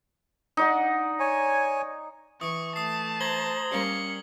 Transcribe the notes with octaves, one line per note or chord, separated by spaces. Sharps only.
D#4 D5 F#5
C#5 G#5
E3 C#6 D#6
A3 A5 D#6 C7
C5 A#5 G#6 F#7 G7
G3 A#3 C#4 C#7